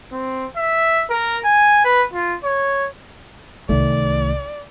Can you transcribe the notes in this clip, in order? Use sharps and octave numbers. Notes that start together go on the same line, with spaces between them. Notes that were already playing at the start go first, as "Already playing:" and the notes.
C4
E5
A#4
G#5
B4
F4
C#5
C2 D#3 A3 D5